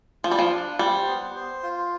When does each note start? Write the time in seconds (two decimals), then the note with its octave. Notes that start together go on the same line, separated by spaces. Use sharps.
0.24 F3 F4
0.31 G3
0.39 F3
0.52 D4
0.79 G3 C5
1.07 B3
1.35 C5
1.63 F4